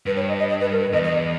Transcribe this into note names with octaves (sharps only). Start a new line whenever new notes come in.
G2 B4
C#5
D#5
D#5
D#5
B4
A#4
B4
E2 D#5
D#5